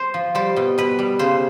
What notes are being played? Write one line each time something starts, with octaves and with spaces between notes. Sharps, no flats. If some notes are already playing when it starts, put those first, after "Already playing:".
Already playing: C5
F3
G3 C5
B2
B2 B4
G3
C#3 C5